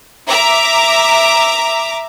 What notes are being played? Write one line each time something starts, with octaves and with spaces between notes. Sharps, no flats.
E5 A#5 D6